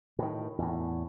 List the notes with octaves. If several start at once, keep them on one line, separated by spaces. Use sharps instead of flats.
A2 D#3
E2 A2